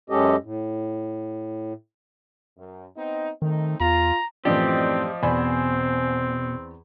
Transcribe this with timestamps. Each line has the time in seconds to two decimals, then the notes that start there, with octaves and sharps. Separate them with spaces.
0.10 F#2 G#3 C#4 G4 A4 D#5
0.43 A2
2.57 F#2
2.96 B3 C4 D#4
3.42 D#3 A3 C4 D#4
3.80 E2 F4 A#5
4.45 F#2 A2 E3 F3 C4 G4 D5 D#5
5.23 E2 B2 C4 C5 D5 G#5 B5